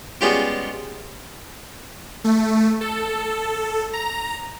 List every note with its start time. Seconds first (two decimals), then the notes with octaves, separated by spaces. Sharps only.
0.21 G3 G#3 B3 C#4 F4 G4
2.24 A3
2.81 A4
3.93 A#5